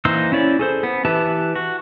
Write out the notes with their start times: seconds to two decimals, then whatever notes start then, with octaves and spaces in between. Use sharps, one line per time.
0.05 E3 A#3 D#4 C5 E6
0.32 C#4 E4 C#5 D5
0.59 G#4 A4 C5
0.83 B3
1.05 E3 G4 B4 E5 A5
1.56 F#4